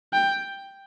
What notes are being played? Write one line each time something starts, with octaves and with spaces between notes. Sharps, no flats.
G5